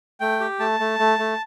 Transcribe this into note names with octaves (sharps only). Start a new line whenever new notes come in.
A3 G5
G4
A3 A5
A3
A3
A3